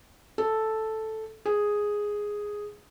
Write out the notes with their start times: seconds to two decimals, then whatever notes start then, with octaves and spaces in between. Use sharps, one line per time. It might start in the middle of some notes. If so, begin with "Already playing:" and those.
0.38 A4
1.46 G#4